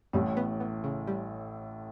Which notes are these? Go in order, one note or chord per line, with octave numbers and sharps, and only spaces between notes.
A1 A2 G3
B3
B3
C#3
G3